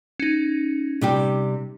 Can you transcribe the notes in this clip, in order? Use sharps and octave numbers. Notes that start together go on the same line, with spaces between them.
C#4 D#4
C3 G3 G4